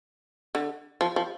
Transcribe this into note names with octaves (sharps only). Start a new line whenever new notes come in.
D3
F3
F3